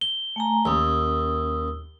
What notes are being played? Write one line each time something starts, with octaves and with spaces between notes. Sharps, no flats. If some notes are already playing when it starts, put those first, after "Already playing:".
G7
A3 G#5 A#5
D#2 C#4 D#6 E6